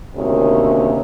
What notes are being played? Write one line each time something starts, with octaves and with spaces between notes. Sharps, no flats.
D2 C3 D#3 A#3 C#4 C#5